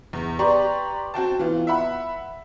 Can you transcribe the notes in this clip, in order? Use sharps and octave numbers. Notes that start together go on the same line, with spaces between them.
E2
G4 B4 D5 A#5 C6 C#6
C4 F#4 G5 A5
E3 B3 F4
E5 F#5 B5